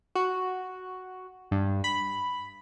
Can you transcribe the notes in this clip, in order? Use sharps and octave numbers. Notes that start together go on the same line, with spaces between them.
F#4
G2
B5